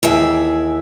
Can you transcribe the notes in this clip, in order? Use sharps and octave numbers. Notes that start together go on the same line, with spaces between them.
D#2 E3 G#4 E5